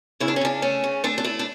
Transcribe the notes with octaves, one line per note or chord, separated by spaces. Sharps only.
C#3 E4
D4
C#4
C#3 D4
A3 C#4
C#3
A3 D4
D4
A3 E4
D4